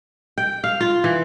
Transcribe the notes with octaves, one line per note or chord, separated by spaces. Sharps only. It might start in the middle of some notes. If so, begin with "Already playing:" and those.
G5
F5
F4
E3